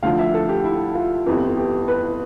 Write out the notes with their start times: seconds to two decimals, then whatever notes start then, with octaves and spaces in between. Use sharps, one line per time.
0.03 D2 D3 F3 F5
0.19 E5
0.34 A4
0.49 G4
0.64 E4
0.95 F4
1.26 G1 F2 E3 G4
1.57 G4
1.88 B4